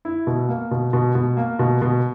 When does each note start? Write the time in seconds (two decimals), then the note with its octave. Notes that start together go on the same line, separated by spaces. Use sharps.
0.05 E4
0.27 B2
0.49 A#3
0.71 B2
0.93 B2
1.15 B2
1.37 A#3
1.59 B2
1.82 B2